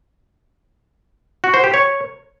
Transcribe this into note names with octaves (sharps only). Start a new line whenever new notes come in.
F#4
C5
G4
C#5